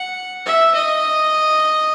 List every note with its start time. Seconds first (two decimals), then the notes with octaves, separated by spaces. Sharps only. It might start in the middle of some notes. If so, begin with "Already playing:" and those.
Already playing: F#5
0.46 E5
0.74 D#5